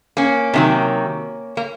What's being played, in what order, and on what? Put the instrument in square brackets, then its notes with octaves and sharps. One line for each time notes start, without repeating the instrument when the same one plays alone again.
[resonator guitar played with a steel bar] A#3 C#4
C3 D#3 F#3
A#3